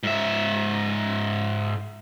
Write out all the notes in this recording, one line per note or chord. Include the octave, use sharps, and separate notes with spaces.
G#2 E5